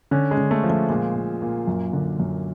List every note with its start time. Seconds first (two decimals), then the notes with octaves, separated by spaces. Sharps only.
0.11 D3 C#4
0.31 G#3
0.38 D3
0.51 A3
0.64 F3
0.70 A3
0.89 A#2 G#3
1.15 A#2
1.42 A#2
1.67 F#2
1.93 D3
2.20 F#2